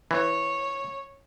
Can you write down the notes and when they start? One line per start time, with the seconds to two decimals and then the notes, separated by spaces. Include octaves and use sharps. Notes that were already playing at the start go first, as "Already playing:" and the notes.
0.11 E3 C#5